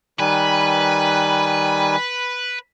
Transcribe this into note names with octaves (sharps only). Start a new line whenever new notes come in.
D#3 G3 B4 G#5